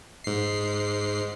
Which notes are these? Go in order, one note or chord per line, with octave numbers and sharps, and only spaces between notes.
G#2 C7